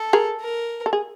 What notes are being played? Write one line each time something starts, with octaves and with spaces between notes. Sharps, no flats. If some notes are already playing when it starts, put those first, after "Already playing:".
Already playing: A4
G#4 A#4
A#4
A4
G#4